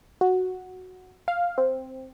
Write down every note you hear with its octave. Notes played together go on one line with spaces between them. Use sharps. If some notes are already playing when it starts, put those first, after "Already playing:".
F#4
F5
C4